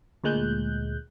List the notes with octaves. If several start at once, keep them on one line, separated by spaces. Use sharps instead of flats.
D2 A#2 G#3 F#6 G6